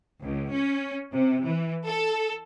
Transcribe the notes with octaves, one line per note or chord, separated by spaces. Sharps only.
C#2
C#4
C3
E3
A4